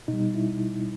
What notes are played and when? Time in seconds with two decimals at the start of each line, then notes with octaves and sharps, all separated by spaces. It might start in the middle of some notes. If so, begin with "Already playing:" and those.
0.08 B2 D#4
0.13 G3
0.34 E4